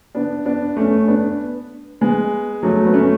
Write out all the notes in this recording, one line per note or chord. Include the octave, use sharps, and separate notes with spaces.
B3 D4
B3 D4
A3 C#4
B3 D4
G#3 B3
F#3 A3
B3
A3 C#4